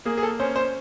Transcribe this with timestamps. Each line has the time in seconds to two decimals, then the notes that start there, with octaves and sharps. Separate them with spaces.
0.05 A#3 G#4
0.18 G#4
0.23 A4
0.40 C#4 C5
0.56 C5